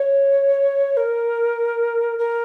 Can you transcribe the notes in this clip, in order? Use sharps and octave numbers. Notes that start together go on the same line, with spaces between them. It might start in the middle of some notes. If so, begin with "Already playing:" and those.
Already playing: C#5
A#4
A#4